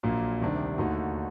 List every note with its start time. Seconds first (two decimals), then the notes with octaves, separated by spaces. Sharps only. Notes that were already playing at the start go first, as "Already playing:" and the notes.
0.03 A#1 A#2 F#3 A#3
0.40 D2 C3 D#3 G3 D4
0.78 D#2 D3 A3 D#4 F#4